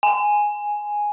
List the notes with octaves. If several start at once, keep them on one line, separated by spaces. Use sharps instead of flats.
G#5